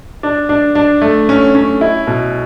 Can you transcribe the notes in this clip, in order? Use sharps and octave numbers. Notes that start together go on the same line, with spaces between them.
D4
D4
D4
A3
C#4
C#4
E4
B2